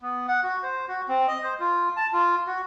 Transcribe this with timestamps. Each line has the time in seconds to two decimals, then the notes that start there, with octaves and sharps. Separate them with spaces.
0.01 B3
0.28 F#5
0.43 F#4
0.63 C5
0.88 F#4
1.08 C4
1.28 D#5
1.43 C5
1.60 F4
1.97 A5
2.13 F4
2.47 F#4